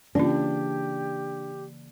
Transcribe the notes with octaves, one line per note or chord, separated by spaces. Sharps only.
C#3 E3 A#3 C#4 D4 F4 G4